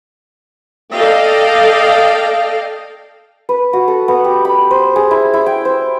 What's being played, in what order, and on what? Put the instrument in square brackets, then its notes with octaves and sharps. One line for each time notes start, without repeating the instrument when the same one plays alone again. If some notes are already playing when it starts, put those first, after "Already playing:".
[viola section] A4 D5 D#5 F5 G5
[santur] B4
F#4
A4
B3
G4
B5
C5
G#4
E4
E4
G5
C5